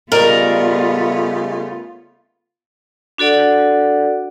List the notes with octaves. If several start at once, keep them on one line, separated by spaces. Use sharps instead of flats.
C#3 G3 A3 B3 F4 A#4 D5 D#5
D4 F#4 A4 D5 F#5